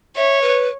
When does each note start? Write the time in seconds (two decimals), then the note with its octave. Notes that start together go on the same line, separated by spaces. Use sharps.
0.16 C#5 E5
0.42 B4